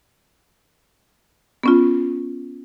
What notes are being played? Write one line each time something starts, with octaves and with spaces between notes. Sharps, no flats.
B3 C#4 F4